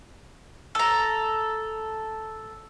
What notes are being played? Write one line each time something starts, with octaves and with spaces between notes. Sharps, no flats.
A4 A#5